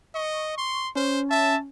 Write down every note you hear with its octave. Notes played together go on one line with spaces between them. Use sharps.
D#5 C#6
C6
C#4 C5
E5 A5